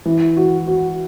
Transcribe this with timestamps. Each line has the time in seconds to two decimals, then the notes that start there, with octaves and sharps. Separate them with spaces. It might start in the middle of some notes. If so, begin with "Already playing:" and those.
0.05 E3
0.37 F#4
0.67 F#4